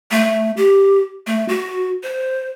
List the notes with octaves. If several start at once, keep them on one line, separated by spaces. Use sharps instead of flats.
A3
G4
A3
F#4
C5